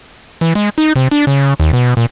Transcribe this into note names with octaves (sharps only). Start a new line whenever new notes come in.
E3
G#3
D#4
C3
D4
C#3
D#2
B2
A#2